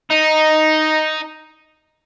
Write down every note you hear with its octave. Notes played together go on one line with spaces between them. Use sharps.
D#4